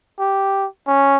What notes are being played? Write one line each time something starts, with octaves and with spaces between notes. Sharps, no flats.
G4
C#4